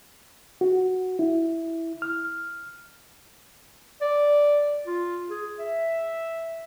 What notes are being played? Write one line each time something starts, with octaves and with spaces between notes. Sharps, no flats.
F#4
E4
F6
D5
F4
G#4
E5